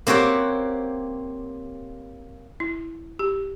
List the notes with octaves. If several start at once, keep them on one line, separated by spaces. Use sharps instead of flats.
A#3 C4 G4 C#5 F#5
E4
G4